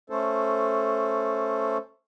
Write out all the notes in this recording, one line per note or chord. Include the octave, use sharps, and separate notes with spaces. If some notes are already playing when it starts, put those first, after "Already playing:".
A3 C#4 A4 C5